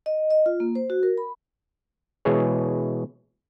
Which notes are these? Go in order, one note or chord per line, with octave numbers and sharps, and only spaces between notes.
D#5
D#5
F4
A#3
C5
F#4
A#4
B5
B2 E3 G#3 G#4 C#5